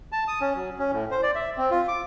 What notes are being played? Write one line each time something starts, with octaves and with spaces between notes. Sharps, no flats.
A5
D#6
C#4
F#3
C#4
A2
C5
D5
E5
C4
F4
D6